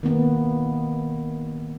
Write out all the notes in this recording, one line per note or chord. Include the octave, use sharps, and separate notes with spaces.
D#3 A#3 B3